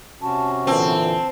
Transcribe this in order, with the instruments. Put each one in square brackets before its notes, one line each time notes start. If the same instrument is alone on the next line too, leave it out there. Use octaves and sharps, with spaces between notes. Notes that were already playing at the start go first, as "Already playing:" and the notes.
[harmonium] C3 C#4 F#4 [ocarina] A5
[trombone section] A#2 D3 E3 [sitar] C4 [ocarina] A5